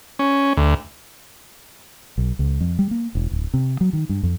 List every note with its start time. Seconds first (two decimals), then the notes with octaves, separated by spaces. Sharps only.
0.19 C#4
0.57 D2
2.18 B1
2.39 C#2
2.61 F2
2.79 G3
2.91 A#3
3.15 E1
3.31 D1
3.54 C3
3.81 F#3
3.93 D#3
4.09 G2
4.23 F2